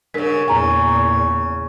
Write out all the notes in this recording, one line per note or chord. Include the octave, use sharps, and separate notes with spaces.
G2 C#3 A#4 B6
E2 A#2 C#3 G#5 A#5